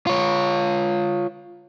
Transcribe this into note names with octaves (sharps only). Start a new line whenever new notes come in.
F4 C#5